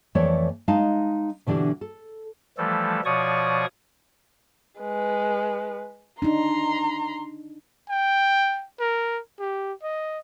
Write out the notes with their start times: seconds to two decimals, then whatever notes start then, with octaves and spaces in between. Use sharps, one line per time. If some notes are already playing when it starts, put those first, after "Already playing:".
0.15 F2 E3 A3 C#5 D5
0.68 G#3 D#4 F5 A5
1.47 B2 D3 E3 D4 G4
1.81 A4
2.58 E3 F3 G3 A3 A4
3.05 B2 F3 C#5 D5 C#6 D#6
4.80 G#3 B4
6.22 D4 D#4 A#5 C6
7.89 G5
8.80 A#4
9.40 G4
9.83 D#5